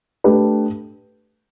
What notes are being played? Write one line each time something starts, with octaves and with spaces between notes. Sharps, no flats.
A3 D4 G4 B4